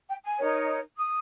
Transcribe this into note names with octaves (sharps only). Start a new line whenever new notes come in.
G5
G#5
D#4 A#4 C#5
D#6